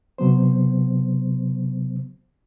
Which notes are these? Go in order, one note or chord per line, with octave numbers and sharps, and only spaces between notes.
C3 F#3 B3 C5